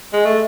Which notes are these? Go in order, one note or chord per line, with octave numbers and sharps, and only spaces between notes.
G#3
A3